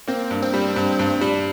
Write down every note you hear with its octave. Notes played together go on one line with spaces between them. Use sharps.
A#3 C4
G2
C4
G3
G2
G2
G3